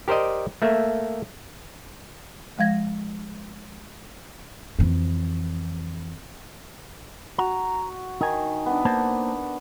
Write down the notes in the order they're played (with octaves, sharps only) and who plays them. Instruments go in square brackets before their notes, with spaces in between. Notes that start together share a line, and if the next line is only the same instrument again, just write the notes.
[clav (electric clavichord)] G4 A#4 C5 D5 D#5
A3 A#3 E5
[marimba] F3 G#3 F5 G#6 A#6
[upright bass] F2 E3
[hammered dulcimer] F#4 [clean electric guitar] A#5
[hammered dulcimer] D#3 [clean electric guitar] D#4 G#5
[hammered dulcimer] B3 D4
[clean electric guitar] A#3 C5 A5